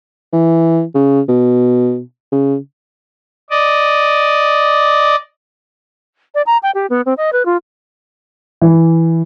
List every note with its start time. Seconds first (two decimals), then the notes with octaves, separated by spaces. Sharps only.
0.33 E3
0.95 C#3
1.28 B2
2.32 C#3
3.50 D5 D#5
6.35 D5
6.46 A#5
6.63 G5
6.75 G4
6.90 B3
7.06 C4
7.17 D#5
7.33 B4
7.45 F4
8.62 E3